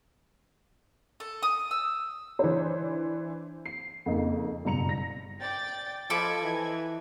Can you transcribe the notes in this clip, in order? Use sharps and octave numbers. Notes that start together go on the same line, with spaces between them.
A4
D#6
E6
E3 D4 C5
C7
F2 C#3 A#3 D#4
F#1 G2 B2 A#5 C#7 F7
A#6
D5 G5 A6
F3 A4 D#5 B5 D6 G#6
E3